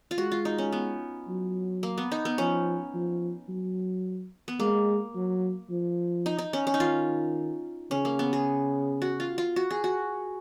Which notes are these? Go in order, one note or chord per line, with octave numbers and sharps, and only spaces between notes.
F4
G#3 F#4
F4
D#4
C#4
B3
F#3
A#3
B3
D#4
B3
F3 C#4
F3
F#3
B3
G#3 A#3
F#3
F3
D#4
D#4
C#4
C#4
D#4
D#3 F4
C#3 C#4
A#3
B3
G#4
F#4
F4
F4
F#4
G#4
F#4